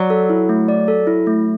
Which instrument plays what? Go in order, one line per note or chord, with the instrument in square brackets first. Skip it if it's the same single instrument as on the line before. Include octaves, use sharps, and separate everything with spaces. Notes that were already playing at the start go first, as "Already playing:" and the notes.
Already playing: [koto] F#3 [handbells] D5
[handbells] A4
E4
A3
D5
A4
E4
A3